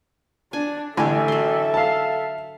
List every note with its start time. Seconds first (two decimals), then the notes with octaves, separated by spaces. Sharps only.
0.53 D4 G#5
0.97 A1 D3 G4 A4 E5 G#5
1.28 F#3 C6
1.74 F5 A5